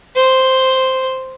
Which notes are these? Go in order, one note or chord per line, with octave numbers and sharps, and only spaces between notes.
C5